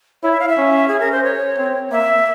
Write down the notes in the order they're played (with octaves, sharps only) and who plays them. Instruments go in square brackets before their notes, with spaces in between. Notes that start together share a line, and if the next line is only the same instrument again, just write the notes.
[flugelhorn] E4 [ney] C#5
[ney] E5
F5
E5
[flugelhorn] C#4
[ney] G#4
A#4
C5
C#5
[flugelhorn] C4
[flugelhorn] A#3 [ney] E5